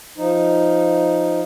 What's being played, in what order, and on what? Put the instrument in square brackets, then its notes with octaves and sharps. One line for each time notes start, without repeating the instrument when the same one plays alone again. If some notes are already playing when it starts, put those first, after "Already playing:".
[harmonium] F3 D#4